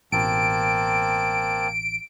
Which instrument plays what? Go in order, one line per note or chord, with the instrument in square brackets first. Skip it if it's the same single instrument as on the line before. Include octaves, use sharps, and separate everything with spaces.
[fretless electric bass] A1 B2 [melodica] A#3 C4 A5 [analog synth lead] D7